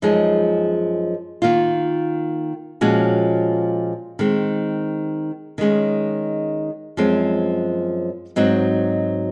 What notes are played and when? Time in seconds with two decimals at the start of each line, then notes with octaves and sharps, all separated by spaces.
0.02 F#2 F3 G#3 D#4 G#4
1.42 D#3 A#3 F4
2.81 A#2 F3 G#3 C#4 F#4
4.19 D#3 G#3 C4
5.58 D#3 G#3 C#4
6.97 F#2 F3 G#3 C4
8.36 G#2 F#3 C4 D#4 F#4